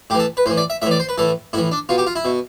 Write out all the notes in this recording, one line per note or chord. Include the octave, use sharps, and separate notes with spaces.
A2 E3 G4 A4
B4
A2 E3 C5
D5
E5
A2 E3 E5
D5
C5
B4
A2 E3 A4
A2 E3 E4
D4
B2 F4
G4
F4
E4
B2